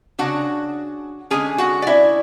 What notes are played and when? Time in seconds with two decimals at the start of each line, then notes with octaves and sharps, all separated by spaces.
0.19 C#3 G#3 D4 F#4 F#5
1.30 D3 G#3 C#4 G#4 G#5
1.58 F#4 F#5
1.82 D5
1.87 E4 E5